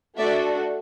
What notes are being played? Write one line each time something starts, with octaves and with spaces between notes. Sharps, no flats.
A3 D4 F#4 A4 D5 E5